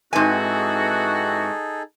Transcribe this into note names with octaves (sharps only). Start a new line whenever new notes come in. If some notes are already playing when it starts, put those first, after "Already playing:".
G#2 E3 C4 D#4 F#4 G#4 A4 G#5